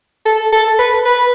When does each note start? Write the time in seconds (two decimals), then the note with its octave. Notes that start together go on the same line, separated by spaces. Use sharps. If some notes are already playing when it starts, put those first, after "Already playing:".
0.26 A4
0.52 A4
0.79 B4
1.05 B4